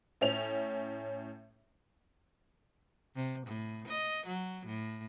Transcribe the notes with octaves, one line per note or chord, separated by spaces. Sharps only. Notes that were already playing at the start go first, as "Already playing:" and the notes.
A2 C#4 F7
C3
A2
D#5
F#3
A2